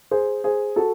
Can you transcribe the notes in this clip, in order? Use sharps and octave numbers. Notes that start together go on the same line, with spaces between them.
G#4 C5
G#4 C5
F#4 A4